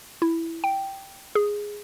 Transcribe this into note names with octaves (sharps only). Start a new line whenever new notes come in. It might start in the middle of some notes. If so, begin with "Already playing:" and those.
E4
G5
G#4